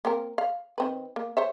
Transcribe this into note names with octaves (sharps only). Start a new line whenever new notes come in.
A#3 C4 A#4
F5
D#3 C4 B4
A#3
C5 C#5 E5